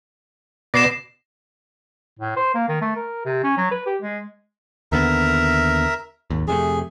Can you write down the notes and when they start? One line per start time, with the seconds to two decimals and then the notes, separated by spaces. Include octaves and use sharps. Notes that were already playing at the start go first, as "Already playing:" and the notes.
0.74 B2 D5 A#6 C7 E7
2.19 A2
2.37 C5
2.55 A#3
2.69 D#3
2.82 A3
2.96 A#4
3.25 C3
3.44 C#4
3.58 F#3
3.71 B4
3.87 G4
4.02 G#3
4.92 D#2 D3 B3 A#4 E5 A#5
6.30 G#1 D#2
6.48 F2 C3 A3 G#4